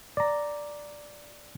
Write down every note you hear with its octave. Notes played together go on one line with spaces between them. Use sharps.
D5 A#5